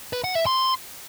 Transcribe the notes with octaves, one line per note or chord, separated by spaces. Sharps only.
B4
F#5
E5
C6